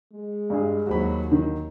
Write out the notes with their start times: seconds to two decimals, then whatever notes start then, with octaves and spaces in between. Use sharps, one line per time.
0.12 G#3
0.50 G2 G#4
0.87 D#2 F#3 F#4 C5 B5
1.32 D#3